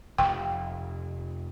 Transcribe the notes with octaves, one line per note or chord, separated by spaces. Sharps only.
F1 G5